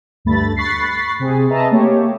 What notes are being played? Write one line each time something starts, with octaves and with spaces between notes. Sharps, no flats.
D2 G2 A3 B5 A6
B5 C#6 F#6 A6 B6 C7
C3 C4 G#4
G#4 B4 D#5 E5 A5 A#5
A3 A#3 G4 C#5